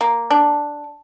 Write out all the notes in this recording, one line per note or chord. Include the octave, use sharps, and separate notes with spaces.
A#3
D4